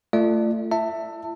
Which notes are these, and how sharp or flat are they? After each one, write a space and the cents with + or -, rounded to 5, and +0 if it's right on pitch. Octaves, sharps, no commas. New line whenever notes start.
A3 +15 F4 -25 D5 +30
E4 +40 E5 +0 A5 +25